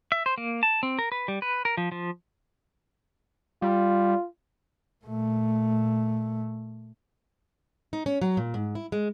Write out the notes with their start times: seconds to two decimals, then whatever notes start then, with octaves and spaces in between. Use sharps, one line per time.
0.12 E5
0.26 C5
0.38 A#3
0.63 A5
0.83 C4
0.99 A#4
1.12 B4
1.28 G3
1.42 B4
1.65 A#4
1.77 F3
1.92 F3
3.62 G3 F4
5.05 A#2 A3
7.93 D#4
8.06 C#4
8.21 F#3
8.37 A#2
8.54 G#2
8.75 E4
8.92 G#3